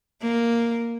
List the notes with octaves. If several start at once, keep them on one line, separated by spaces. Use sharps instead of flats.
A#3